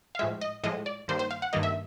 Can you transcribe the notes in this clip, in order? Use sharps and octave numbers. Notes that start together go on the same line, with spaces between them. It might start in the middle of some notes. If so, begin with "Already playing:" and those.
F5
A2 F3 G#3 E5
D#5
A2 F3 G#3 D#5
D5
G2 D#3 G3 A#3 C5
C5
F5
F#5
G2 D#3 G3 A#3 D#5
E5